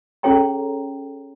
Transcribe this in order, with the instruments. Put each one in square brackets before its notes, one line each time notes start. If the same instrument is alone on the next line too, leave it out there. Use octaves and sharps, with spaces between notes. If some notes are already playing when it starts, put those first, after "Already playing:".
[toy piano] C#4 G#4 A4 C#5 G5 A#5